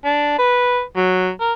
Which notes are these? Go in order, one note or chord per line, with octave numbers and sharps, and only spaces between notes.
D4
B4
F#3
A#4